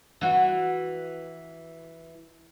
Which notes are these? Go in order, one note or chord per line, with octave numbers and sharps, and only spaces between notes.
E3 F#4